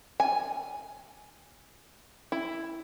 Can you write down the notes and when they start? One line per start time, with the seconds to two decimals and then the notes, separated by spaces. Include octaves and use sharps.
0.20 G#5
2.32 E4